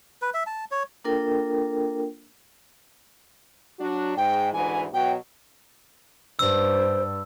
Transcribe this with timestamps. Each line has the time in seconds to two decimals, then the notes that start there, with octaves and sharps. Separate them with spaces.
0.22 B4
0.34 E5
0.47 A5
0.71 C#5
1.04 A#3 D4 F4 A4 A#4 G5
3.79 F#3 D4 F#4
4.17 G#2 G5
4.53 D2 G#2 E3 G#5
4.93 B2 F#3 G5
6.39 G2 C5 E6